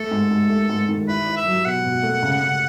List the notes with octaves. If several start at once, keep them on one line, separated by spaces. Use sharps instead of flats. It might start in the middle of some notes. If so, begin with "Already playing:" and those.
Already playing: A3 A4
G#2
G#2
A3
G#2
D#3
E4 B4
E4
E5
F#3
B2 F#5
B2
A3
C#3
C#3